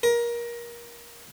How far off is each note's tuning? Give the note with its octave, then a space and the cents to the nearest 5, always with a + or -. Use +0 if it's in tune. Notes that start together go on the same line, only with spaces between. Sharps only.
A#4 +25